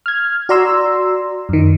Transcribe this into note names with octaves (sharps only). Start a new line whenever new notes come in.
F6 G#6
F#4 D5 A#5 C6 E6
F#2 D#3